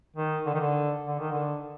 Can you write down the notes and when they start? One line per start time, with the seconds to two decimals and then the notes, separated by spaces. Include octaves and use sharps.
0.16 D#3
0.46 D3
0.54 D#3
0.60 D3
1.07 D3
1.19 D#3
1.31 D3